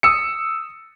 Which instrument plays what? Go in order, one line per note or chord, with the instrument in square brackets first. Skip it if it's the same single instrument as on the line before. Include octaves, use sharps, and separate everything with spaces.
[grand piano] D#6 E6 C#7